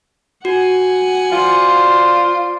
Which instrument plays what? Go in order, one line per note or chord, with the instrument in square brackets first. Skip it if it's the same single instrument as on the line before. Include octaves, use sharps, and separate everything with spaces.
[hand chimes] F#4 [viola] F#5 G#5
[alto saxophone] F4 [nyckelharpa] C5 D5